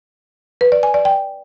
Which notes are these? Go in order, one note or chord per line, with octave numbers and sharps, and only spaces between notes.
B4
D5
G#5
D5
G5